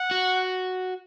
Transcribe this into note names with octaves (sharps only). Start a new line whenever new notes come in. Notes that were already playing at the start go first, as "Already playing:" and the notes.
Already playing: F#5
F#4